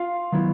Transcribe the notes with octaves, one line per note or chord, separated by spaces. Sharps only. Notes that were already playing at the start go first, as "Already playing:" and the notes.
Already playing: F4 F5
D#3 F#3 B3 E4